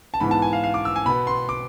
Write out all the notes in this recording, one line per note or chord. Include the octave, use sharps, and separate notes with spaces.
A5
G#2 E3 B3 B5
A5
G#5
F5
F5
D6
E6
G#5
B2 B3 B5
C6
D6